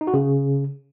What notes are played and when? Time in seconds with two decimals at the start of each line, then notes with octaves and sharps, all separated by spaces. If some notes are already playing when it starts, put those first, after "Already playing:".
0.01 D#4
0.07 F#4
0.14 C#3